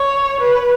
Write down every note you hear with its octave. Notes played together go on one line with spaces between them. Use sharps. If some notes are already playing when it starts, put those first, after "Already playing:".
Already playing: C#5
B4